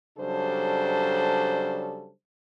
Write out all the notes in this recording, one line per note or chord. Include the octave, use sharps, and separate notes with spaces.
C#3 F#3 G3 D4 A4 C5